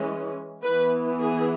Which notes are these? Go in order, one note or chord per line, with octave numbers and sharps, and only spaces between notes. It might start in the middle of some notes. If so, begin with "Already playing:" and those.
Already playing: E3 G#3 C#4
E3 B3 B4
G#4